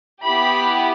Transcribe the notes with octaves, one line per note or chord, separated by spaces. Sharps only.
B3 E4 G4 B5